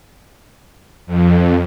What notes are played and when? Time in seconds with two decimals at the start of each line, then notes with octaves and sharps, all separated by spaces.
1.07 F2